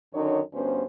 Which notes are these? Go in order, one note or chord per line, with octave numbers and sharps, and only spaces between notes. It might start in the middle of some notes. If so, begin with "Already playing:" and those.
F#2 D3 D#3 D#4 C#5
D2 G2 B3 C#4 C5